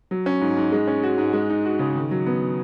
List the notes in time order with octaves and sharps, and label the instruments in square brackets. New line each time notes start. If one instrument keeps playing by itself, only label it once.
[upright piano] F#3
C#4
G#2
G#2
G#3
C#4
F#4
G#2
G#3
D#4
F#4
C#3
D#3
F#3
B3